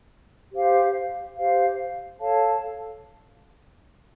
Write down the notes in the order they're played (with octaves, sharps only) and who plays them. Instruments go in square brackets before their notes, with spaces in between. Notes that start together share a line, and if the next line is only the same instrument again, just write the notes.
[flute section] G4 C5 F5
G4 C5 F5
A4 C#5 F5 A5